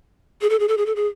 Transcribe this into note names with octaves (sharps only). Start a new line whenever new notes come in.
G#4
A4
G#4
A4
G#4
A4
G#4